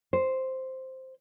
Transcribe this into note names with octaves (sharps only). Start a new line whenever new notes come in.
C5